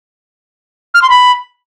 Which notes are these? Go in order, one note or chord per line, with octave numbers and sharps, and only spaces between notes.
F6
C6
B5